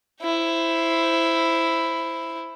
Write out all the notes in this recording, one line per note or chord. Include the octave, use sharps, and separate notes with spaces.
E4 C5